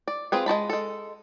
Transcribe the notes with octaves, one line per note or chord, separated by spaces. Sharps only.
D5
C4 F4 G#4 B4
G#3 F#4 A5 B5
G#3 A4